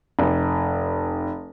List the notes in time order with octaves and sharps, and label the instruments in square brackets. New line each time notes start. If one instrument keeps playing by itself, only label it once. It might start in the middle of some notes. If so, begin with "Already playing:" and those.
[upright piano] F1